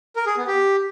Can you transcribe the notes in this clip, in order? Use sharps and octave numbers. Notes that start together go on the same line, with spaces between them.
A#4
G#4
B3
G4